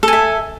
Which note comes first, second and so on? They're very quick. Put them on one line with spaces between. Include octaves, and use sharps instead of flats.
A4 G#5 E5